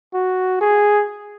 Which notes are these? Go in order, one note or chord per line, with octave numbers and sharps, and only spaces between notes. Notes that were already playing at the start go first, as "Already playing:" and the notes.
F#4
G#4